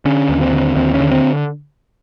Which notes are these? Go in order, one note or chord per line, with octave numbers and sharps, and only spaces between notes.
D3 C#4
D#2
C4
D3
D#2 C4
C#4
D3
C4